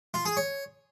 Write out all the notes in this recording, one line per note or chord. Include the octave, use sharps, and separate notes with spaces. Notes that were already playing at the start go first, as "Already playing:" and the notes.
F4
G#4
C#5